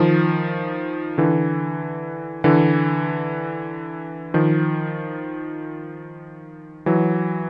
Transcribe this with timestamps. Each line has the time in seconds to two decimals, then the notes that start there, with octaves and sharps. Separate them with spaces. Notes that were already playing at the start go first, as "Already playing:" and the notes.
Already playing: D#3 F3
1.18 D3 E3
2.44 D3 E3
4.34 D#3 F3
6.86 E3 F#3